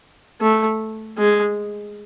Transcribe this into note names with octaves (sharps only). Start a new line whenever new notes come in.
A3
G#3